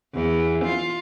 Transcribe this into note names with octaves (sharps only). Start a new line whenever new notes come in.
E2
F4